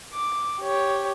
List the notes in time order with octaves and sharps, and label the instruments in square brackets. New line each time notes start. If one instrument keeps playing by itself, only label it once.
[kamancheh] D6
G4 C#5